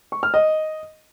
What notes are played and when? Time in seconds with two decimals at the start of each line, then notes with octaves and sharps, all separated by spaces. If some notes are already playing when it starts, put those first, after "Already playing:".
0.12 C#6
0.23 F6
0.34 D#5